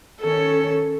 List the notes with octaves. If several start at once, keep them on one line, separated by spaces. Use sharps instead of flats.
D#3 C#4 A4 C#5